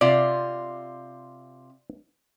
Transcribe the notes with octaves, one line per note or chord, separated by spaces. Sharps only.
C3 F4 D5